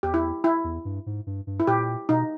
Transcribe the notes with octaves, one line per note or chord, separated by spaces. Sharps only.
E2 G4
E4
E4
E2
G2
G#2
G2
G2
E4
A#2 G4
B2 D#4